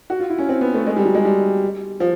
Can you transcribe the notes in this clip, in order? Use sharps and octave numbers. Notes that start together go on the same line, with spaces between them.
F#4
F4
E4
C#4
C4
B3
A3
G#3
G3
F#3
G#3
G3
F3